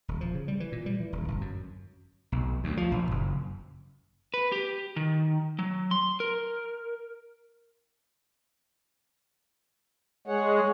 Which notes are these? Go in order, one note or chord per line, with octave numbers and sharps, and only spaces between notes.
D#1
F3
C#3
G3
E3
A#2
G3
E3
D#1
G1
F#2
B1
D2
F3
A#1
F#1
B4
G4
D#3
F#3
C6
A#4
G#3 G#4 C#5 F#5